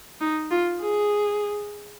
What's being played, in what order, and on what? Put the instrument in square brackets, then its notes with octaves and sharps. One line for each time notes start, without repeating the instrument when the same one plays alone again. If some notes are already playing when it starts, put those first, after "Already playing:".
[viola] D#4
F4
G#4